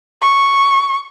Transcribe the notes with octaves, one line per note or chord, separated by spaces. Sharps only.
C#6